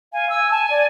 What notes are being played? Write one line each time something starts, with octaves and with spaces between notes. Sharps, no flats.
F5 G#5
G#5 E6
A5
D5